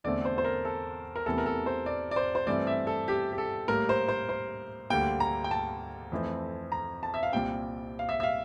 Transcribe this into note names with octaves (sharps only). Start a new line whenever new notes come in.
E2 D3 A3 C4 D5
C5
C5
A#4
A4
A#4
E2 C3 E3 A3 A4
A#4
A4
C5
D5
D5
C5
C5
G2 E3 A3 C4 D5
E5
A4
G4
G4
A4
A2 G3 A#3 A#4
C5
C5
C5
D2 D3 G3 A#3 G5
A#5
G5
A5
F2 E3 A3 C4
A#5
A5
E5
F5
C2 A#2 G3 C4 G5
F5
E5
E5
F5